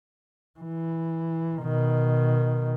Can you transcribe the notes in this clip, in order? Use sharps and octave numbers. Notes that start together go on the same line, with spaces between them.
E3
B2 D#3